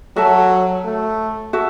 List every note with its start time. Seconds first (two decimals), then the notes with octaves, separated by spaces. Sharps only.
0.16 F#3 F#4 A4 E5 A5
0.85 A3
1.53 F#4 A4 E5